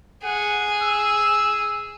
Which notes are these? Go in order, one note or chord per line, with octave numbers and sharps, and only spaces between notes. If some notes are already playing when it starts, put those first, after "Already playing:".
G#4 F#5
E6